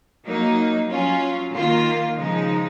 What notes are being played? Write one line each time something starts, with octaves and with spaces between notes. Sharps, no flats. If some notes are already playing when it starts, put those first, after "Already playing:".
F#3 A#3 D#4
F#3 C#4 F4
D#3 A#3 F4
C#3 F3 G#3 D#4